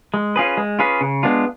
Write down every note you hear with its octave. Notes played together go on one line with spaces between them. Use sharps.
G#3
C#4 F4 G#4 B4
G#3
C#4 F4 G#4 B4
C#3
G#3 B3 D4 F4